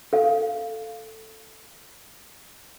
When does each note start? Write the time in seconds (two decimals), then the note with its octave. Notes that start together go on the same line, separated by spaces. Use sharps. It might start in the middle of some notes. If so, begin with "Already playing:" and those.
0.13 A4 F5